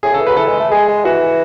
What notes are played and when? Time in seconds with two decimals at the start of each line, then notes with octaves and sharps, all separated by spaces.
0.03 A2 G#4
0.12 C#3 A4
0.20 E3
0.26 F#3 B4
0.37 E3 A4
0.48 G#3
0.60 A3
0.71 G#3 G#4
0.88 G#3
1.05 E3 F#4